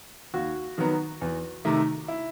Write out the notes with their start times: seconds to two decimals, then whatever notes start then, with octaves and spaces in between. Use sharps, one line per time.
0.34 D#2 F#4
0.78 D#3 F#3 B3
1.21 E2
1.65 C3 D#3 A3
2.08 E4